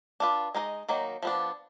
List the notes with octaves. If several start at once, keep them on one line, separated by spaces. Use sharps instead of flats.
D4 F4 B4
G#3 D#4 A#4 D#5
D#3 F#3 A#3 D#4
F3 B3 D4